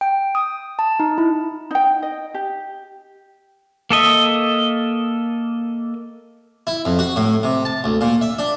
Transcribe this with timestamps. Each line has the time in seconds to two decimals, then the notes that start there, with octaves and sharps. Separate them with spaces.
0.01 G5
0.35 D#6
0.79 A5
1.00 D#4
1.18 E4
1.71 D#4 G5
2.02 D#5
2.34 G4
3.90 A#3 A4 D#5 E5
6.67 E4
6.85 F2
6.99 F#4
7.16 A2
7.43 C3
7.65 A5
7.84 D2
8.01 A#2
8.21 E5
8.39 D4